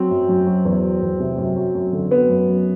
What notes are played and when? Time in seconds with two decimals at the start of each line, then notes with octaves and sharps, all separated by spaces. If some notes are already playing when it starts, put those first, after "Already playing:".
Already playing: F#3 C4
0.10 F#2
0.29 F#2
0.47 F#3
0.65 E2
0.83 F#3
1.01 E2
1.20 C3
1.38 F#2
1.56 F#3
1.75 F#2
1.93 D3
2.11 F#3 B3
2.29 F#2
2.48 F#2